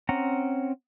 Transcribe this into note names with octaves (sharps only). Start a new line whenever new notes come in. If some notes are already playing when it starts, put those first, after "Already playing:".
C4 C#4 F#5 A#5